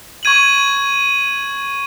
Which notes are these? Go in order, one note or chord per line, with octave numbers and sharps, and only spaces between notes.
C#6 G#6 D#7 F#7